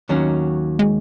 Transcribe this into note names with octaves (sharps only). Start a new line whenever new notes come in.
D#2 D#3 F#3 C#4 F#4
G#3